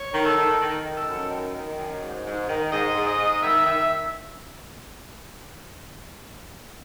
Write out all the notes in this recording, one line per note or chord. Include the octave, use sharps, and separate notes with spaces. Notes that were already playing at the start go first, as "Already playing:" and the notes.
Already playing: C#5
D#3
A4
D#3
D#3
D#3
A4
F#2
D#3
D#3
F#2
G#2
G#2
D#3
G#2 D#5
G#2
D#5
G#2
D#3 E5
D#3 E5